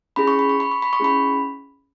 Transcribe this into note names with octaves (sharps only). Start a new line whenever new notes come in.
C#4 E4 G#4 B5
C#6
B5
C#6
B5
C#6
B5
C#6
C#4 E4 G#4 B5